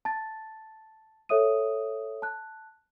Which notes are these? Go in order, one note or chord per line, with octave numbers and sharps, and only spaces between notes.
A5 A6
A4 C#5 E5 D#6 D#7
A5 F#6